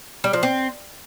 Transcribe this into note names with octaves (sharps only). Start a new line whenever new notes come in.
G3
F3
C4